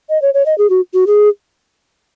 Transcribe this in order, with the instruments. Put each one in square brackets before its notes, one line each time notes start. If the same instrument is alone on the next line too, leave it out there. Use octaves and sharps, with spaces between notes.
[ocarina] D#5
C#5
C#5
D#5
G#4
F#4
F#4
G#4